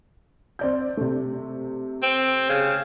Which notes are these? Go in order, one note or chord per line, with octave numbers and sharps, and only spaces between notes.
C4 D5 G6
C3 A3
C4
C#3